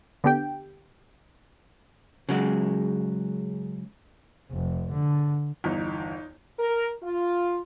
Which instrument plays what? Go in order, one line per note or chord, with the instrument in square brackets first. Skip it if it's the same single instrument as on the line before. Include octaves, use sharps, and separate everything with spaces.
[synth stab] D3 B3 G4 G5
[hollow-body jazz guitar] C#3 F#3 G#3
[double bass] F1
D3
[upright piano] G1 E2 [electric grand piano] D#4
[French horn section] A#4
F4